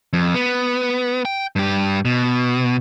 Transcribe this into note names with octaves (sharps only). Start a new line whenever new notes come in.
F2
B3
G5
G2 G4
B2